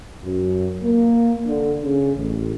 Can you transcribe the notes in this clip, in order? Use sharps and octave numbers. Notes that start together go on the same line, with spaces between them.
F#2
A#3
D3
C#3
A1